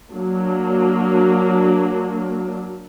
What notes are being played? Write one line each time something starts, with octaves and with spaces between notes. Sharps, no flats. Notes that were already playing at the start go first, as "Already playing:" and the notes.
F#3 A#3 D4